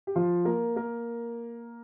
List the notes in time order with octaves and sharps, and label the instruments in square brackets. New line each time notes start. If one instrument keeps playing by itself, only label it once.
[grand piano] G4
F3 F4
A#3 A#4
A#3 A#4